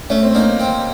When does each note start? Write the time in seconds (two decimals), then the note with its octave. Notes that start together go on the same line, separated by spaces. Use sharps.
0.10 A3 C#4
0.23 C4
0.35 A#3 C#4 D#4
0.60 C4